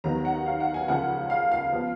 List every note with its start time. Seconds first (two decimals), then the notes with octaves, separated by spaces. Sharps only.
0.04 D#2 D#3 F#3 B3 A#5
0.25 F#5
0.46 F5
0.60 F#5
0.74 G#5
0.88 C#2 C#3 F3 A#3 F#5
1.30 F5
1.52 F5
1.72 F3 B3